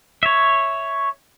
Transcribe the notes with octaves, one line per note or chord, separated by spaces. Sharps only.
C#5 E5